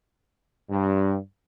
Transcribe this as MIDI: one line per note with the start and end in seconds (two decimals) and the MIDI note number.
0.70 1.17 43